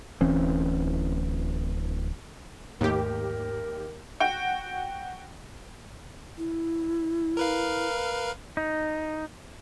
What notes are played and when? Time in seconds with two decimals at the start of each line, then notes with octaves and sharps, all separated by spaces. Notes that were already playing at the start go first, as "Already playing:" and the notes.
0.21 D1 E3 C4 C#4
2.81 D#2 G#2 A3 G4 A#4
4.20 F#4 G5
6.38 E4
7.37 A#4 B4 F5
8.57 D#4